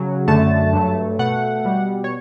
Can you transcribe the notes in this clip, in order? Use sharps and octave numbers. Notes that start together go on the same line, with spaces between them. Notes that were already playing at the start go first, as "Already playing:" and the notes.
Already playing: C#3 F#3
F#2 D3 A3 A5
G2 F#3 A3
B2 A3 F#5
B2 G3
C#5